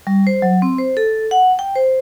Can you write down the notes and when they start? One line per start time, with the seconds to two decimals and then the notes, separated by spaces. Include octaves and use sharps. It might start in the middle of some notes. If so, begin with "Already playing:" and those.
0.07 G3
0.27 C5
0.42 F#3
0.62 C4
0.78 C5
0.97 A4
1.31 F#5
1.59 G5
1.75 C5